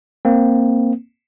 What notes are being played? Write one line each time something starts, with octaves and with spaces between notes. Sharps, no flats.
A#3 C4